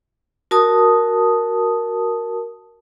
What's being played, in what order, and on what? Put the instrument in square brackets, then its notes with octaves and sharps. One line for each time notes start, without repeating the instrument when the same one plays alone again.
[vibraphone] F#4 A#4 A5 D#6